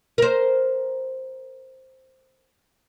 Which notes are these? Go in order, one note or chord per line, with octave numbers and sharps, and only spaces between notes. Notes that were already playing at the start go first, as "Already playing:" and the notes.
A#4 C5